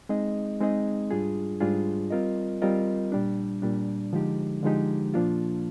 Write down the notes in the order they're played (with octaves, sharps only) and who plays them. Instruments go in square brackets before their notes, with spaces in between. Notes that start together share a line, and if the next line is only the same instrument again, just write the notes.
[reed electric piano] G#3 C4 D#4 G#4 D#5
G#3 C4 D#4 G#4 D#5
G#2 G3 D4 F4 G#4
G#2 G3 D4 F4 G#4
G3 C4 F4 A#4 D#5
G3 C4 F4 A#4 D#5
A#2 G3 D4
A#2 G3 D4
D3 F3 G#3 D#4 G4
D3 F3 G#3 D#4 G4
A#2 F3 A#3 D4 F4